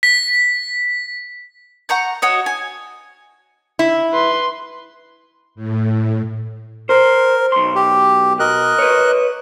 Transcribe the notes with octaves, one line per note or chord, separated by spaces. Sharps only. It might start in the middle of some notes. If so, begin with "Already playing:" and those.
B6
F#5 A#5 C#6 G6
F#4 C#5 D#5
G#5
E4
B4 C6
A2
A#4 C5
B1 C6
G4
B2 A#4 D#5 F#6
B4 C#5